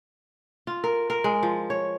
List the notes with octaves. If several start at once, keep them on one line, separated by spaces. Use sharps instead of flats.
F4
A#4
A#4
G#3
F3
C#5